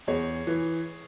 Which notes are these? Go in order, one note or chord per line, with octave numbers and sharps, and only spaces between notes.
E2 G#4 C#5
E3